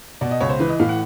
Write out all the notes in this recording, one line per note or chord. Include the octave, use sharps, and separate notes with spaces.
B2 D5
D#5
C#2 C#5
C5
E3 B4
D#5
A2 F5
F#5